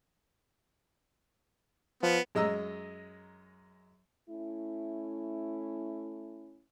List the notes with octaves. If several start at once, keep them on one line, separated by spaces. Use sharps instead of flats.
F3 B3
F#2 G#3 D#5 A#5 E6
A3 C#4 E4